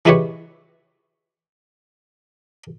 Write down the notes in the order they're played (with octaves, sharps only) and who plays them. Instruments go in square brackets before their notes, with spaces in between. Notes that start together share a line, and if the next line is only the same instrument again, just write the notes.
[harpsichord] E3 G#3 E4 G4 B4 C#5